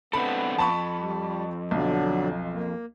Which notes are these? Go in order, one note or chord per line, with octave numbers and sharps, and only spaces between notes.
B3 C4 D4 A4 B5
F2 A5 B5 C#6
G3
B1 D3 F#3 D4
A#3